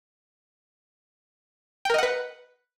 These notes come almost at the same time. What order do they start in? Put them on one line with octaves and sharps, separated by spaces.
G5 A#4 D#5 F#5 B4